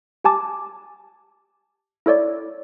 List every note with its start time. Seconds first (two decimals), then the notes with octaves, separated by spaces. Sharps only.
0.24 G4 G#5 A5 D6
2.06 E4 A4 C#5 D5